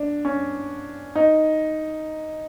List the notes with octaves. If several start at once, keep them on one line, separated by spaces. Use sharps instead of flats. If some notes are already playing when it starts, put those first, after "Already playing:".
Already playing: D4
C#4
D#4